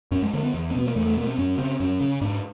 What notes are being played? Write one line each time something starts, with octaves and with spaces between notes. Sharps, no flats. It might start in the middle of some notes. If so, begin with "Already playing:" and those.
F#2 C#4
G#3
D3 A#3
B3
E2
C4
B2 B3
A#3
E2 A3
A3
B2 A#3
C4
F#2 C#4
C#3 C4
F#2 C#4
C#3
G#2 D4